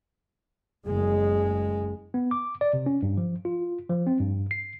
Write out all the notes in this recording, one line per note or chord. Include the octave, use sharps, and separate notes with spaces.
F#1 G#3
B3
D6
D5
C3
C#4
G2
F3
F4
F3
C4
G2
C7